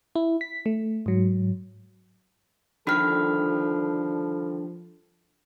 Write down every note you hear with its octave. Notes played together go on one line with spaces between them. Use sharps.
E4
B6
A3
G#2 F#3
D3 D#3 F3 G3 D4 A4 B5 F6